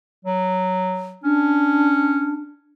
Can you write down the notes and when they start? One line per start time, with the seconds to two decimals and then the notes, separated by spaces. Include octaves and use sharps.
0.25 F#3
1.23 C#4 D4